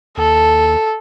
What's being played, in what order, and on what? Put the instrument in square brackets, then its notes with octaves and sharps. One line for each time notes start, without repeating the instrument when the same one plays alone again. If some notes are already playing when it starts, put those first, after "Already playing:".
[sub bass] D#2 [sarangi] A4